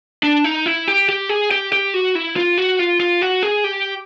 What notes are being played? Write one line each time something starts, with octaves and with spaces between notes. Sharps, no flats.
D4
D#4
E4
G4
G4
G#4
G4
G4
F#4
E4
F4
F#4
F4
F4
F#4
G#4
G4